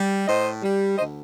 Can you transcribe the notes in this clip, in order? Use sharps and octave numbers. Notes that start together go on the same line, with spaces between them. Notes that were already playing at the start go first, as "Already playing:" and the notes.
Already playing: G3
A2 C5 D#5
G3
D2 C5 D#5